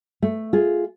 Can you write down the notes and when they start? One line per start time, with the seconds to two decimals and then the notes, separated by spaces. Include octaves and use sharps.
0.22 A3
0.53 F4 G#4